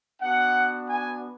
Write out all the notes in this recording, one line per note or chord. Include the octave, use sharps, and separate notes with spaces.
B3 D4 F#4 F#5
G#5